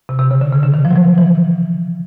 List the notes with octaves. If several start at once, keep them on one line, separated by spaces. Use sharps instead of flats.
C3
C3
C#3
D3
C#3
D3
D#3
F3
F#3
F3
E3